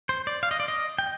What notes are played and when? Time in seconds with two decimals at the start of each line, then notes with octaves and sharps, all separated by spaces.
0.09 C5
0.27 D5
0.43 F5
0.51 D#5
0.60 D5
0.68 D#5
0.99 G5